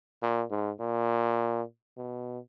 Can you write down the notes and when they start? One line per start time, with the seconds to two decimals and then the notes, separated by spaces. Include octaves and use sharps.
0.23 A#2
0.51 G#2
0.80 A#2
1.98 B2